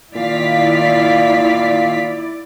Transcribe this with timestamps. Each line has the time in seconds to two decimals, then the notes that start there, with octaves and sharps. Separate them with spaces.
0.15 A#2 D#3 E4 D5 F5 B6